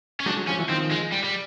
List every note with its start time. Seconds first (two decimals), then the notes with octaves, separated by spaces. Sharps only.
0.20 C#4
0.26 F#3 G#3 D4
0.37 F#3 G#3
0.48 F3 G3 C#4
0.58 E3 F#3
0.69 D#3 F3 C4
0.91 G#3
1.12 G3
1.24 G3